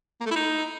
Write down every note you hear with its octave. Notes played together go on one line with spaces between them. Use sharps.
A#3
A3
E4
D#4